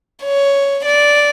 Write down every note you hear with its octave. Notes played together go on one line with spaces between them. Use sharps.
C#5
D5